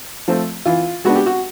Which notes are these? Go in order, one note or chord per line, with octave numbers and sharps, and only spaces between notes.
F3 A3 C4
E3 F4
G#3 B3 D4 F#4
G4
F#4